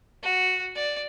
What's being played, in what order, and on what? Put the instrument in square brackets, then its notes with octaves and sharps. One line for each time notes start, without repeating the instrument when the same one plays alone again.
[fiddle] F#4
D5